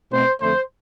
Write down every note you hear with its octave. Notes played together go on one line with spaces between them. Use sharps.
B2 A3 C4 C5
F2 D3 A3 C5